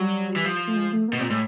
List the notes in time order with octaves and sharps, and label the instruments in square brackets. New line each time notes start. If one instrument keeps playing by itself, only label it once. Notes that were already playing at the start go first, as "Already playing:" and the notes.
Already playing: [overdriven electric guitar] F#3 [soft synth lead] G3
[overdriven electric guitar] E3
F3
[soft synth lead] A3
G#3
A3
A#3
[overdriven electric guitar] B2
[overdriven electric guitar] A#2 [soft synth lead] C4
[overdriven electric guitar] A2 [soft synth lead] G#3